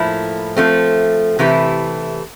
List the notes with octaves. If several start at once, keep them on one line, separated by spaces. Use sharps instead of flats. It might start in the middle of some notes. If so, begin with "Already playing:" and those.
Already playing: A2 F3 A#3 E4
F3 A3 C4
C3 E3 A3 E4 G4